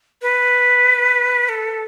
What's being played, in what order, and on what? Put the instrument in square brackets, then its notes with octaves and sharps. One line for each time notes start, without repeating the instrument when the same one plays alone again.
[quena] B4
A4